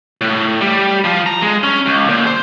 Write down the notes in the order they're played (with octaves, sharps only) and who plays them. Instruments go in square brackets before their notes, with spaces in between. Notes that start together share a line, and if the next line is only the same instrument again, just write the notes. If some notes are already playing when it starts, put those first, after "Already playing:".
[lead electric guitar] A2
G3
F3
A#5
G#3
C#4
C#2
A#2
C5